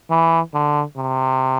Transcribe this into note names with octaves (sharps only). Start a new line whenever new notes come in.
E3
D3
C3